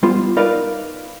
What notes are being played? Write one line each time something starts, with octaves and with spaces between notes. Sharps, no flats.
G3 B3 F4 C5
D#4 A#4 B4 D5 F5